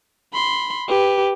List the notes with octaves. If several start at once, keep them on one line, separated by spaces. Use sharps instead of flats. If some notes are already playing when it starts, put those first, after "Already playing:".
B5 C6
G4 B4